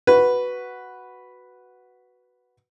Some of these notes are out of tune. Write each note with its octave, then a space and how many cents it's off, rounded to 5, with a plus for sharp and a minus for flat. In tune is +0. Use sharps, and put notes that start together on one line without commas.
F#4 +0 B4 +0